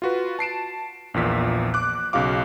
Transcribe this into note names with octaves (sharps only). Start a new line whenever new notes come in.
F4 F#4 B4
A5 C7 D7 E7
A#1 E2 A#2 B6
D6 F#6
B1 C#3 F#4 F5 D6